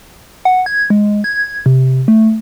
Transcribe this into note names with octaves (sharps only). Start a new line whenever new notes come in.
F#5
G#6
G#3
G#6
C3
A3